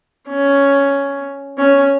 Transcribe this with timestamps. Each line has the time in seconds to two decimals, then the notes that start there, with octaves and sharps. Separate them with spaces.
0.29 C#4
1.58 C#4